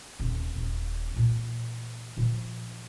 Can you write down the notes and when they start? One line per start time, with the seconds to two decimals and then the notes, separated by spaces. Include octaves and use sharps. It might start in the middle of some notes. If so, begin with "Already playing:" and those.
0.20 D#1 C3
0.56 D#1 E4
1.15 A#2 E3
2.17 A#2 F3